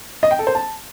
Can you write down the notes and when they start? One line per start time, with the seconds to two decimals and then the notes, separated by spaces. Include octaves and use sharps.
0.23 D#5
0.31 G5
0.39 A4
0.47 C5
0.55 A5